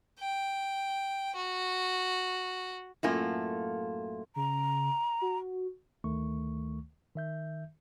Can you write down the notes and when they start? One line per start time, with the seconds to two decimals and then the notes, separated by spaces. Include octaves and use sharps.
0.19 G5
1.35 F#4
3.03 F#2 A2 A3 A#3 F4 G#5
4.36 C#3 A#5
5.22 F#4
6.04 D2 D#3 A3 C#6
7.16 D#3 E5 G6